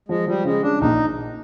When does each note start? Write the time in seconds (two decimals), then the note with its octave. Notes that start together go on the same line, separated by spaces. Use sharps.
0.09 F3 G#3
0.27 F3 G3
0.45 C#3 G#3
0.62 C#3 D4
0.81 A#1 D#4